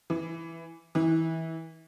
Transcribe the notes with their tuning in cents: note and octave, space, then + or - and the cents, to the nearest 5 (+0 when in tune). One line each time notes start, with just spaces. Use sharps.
E3 +5
E3 -25